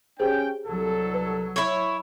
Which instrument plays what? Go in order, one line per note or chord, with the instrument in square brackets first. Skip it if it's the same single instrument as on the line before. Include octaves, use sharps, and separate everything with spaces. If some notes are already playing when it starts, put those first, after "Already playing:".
[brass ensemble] C#4 G5 [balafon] G4 G#4 C5
[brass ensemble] C2 A4 [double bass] F#3
[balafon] B4
[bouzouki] E4 C#5